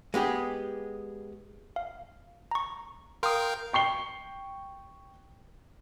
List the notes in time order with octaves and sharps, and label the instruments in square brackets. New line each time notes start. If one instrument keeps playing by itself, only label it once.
[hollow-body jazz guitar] G#3 B3 G4 G#4
[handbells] F5
A#5 C#6
[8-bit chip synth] A#4 F5 G5 [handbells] C6 D#6
[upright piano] G5 C#6 C7 G7